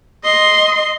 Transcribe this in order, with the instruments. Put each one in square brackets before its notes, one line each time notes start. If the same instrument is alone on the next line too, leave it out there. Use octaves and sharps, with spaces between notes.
[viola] D#5 C6